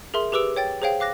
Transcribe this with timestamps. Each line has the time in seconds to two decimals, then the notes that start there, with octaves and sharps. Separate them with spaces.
0.14 G#4 A#4 E5 C6
0.32 G4 G#4 B4 D6 E6 D7
0.56 C#5 G5 A6
0.82 G#4 C5 C#5 F5 G5
1.00 F5 D6 F#6 A#6